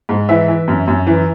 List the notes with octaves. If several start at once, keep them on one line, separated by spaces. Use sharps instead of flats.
G#2
E3 E5
E3
F#2
F#2
E3